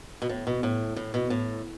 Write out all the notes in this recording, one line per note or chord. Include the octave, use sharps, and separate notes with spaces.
B2
A2
B2
A2
A2
B2
A2